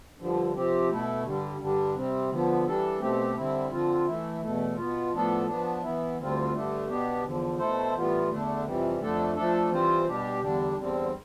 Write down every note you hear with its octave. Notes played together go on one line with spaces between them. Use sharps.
G2 D3 F3
C3 F3 C4 G4
B2 A3 E4
G2 D3 G3
G2 D3 G3 D4
C3 G3 C4
D3 F3 B3
E3 G3 D4 A4
B2 A3 C4 G4
D3 G3 C4 E4
D3 F3 C4 F4
E3 A3 E4
E2 B2 A3
B2 B3 F4
A2 F3 B3 D4 A4
F3 B3 D4
E3 B3 E4
D2 D3 G3 C4 F4
G2 D3 A3 D4
B2 B3 D4 G4
E2 D3 F3
B2 A3 E4 A4 C5
A2 E3 G3 B3 F4
E2 D3 A3 D4
F2 C3 E3 G3
F2 D3 A3 D4 A4
F3 A3 D4 A4
E3 G3 C4 F4 C5
B2 G3 D4 G4
E2 D3 G3 D4
E2 D3 G3 C4